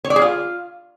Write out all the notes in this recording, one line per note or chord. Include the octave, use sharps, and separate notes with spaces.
C#5
D5
G#4
F4